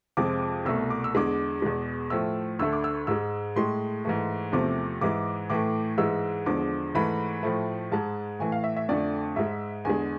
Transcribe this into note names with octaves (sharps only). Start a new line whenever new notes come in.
F2 C3 F3 G#3 D6
C2 B2 A3 E6
D6
E6
E2 D3 G#3 D6
E2 B2 G#3
A2 F3 A3 E6
D2 D3 A3 E6
D6
E6
G#2 G#3 E6
A2 G#3 C6
G#2 E3 A3
E2 C3 F3 A3 D6
G#2 E3 G#3 D6
A2 E3 A3 D6
G#2 E3 G#3 E6
E2 D3 F3 G#3 D6
G#2 E3 A3 B5
A2 F3 A3
G#2 G#3 A5
A2 E3 A3 G#5
F5
E5
E5
F2 D3 A3 D5
G#2 G#3 E5
E2 D3 G#3 G#5